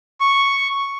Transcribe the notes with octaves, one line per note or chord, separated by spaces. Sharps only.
C#6